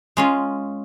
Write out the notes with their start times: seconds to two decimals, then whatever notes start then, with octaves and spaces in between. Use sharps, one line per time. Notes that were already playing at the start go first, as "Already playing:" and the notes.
0.17 G#3 C#4 F4